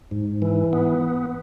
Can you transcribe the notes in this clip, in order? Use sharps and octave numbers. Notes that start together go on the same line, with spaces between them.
G#2
E3
B3